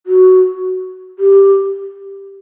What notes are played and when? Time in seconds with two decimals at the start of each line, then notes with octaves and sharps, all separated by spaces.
0.07 F#4
1.19 G4